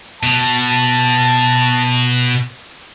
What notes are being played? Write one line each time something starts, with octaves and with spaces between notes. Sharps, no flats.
B2 A5